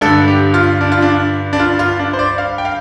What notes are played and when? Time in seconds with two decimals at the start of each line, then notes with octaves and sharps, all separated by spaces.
0.01 G2 A4
0.05 D3
0.28 G4
0.54 F4
0.81 D4
0.92 F4
1.02 D4
1.53 D4
1.60 F4
1.79 F4
1.99 D4
2.13 C5
2.19 D5
2.38 F5
2.58 G5
2.65 F5